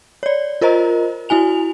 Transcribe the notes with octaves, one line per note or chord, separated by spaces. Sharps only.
C#5 D5
F4 A#4 C5 D#5 A#5
E4 F#4 G#5 F7